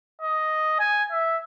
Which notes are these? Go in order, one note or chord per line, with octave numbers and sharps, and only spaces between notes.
D#5
G#5
E5